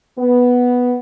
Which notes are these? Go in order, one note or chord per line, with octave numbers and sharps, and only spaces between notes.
B3